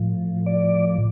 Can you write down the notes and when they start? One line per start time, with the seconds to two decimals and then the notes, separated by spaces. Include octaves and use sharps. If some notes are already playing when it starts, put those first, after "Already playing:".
Already playing: A2 F3
0.46 D5